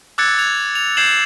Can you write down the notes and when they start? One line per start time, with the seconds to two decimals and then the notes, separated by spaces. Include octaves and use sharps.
0.18 D6 E6 F#6 G#6 A6 C#7
0.37 F#6 G#6 F7
0.75 F7
0.97 G6 G#6 C7 E7 F#7